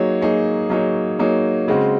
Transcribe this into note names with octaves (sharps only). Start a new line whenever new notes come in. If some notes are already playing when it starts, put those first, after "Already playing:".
Already playing: F#3 A#3 D#4 G#4 C#5
F#3 A#3 D#4 G#4 C#5
F#3 A#3 D#4 G#4 C#5
F#3 A#3 D#4 G#4 C#5
C#3 G#3 C4 F#4